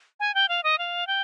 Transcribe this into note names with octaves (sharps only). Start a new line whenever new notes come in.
G#5
G5
F5
D#5
F5
G5